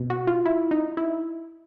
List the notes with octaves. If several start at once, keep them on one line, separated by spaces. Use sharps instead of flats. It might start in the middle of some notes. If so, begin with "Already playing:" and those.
Already playing: B2
F#4
F4
E4
D#4
E4